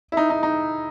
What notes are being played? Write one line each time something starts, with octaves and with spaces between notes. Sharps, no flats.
E4
D#4
D#4
D#4